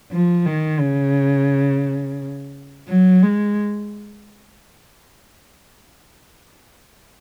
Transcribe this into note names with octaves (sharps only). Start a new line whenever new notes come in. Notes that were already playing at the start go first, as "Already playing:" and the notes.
F3
D#3
C#3
F#3
G#3